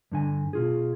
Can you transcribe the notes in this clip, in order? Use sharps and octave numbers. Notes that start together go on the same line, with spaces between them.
G2 D3 G#5
B2 F4 G#4